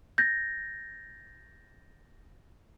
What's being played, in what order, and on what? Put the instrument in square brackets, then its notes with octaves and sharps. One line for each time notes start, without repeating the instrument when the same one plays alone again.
[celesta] G6 A6 A#6